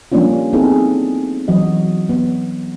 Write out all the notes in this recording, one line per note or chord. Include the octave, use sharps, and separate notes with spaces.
F3 G3 A#3 C#4 D4 F4
B3 C4 D#4 E4 G#4 A4
E3 F#3 F#4 D#5
B3